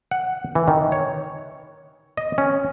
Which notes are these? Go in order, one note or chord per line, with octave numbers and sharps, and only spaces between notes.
F#5
E3
D#3
C#5
D#5
C#4